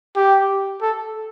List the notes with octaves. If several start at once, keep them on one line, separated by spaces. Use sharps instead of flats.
G4
A4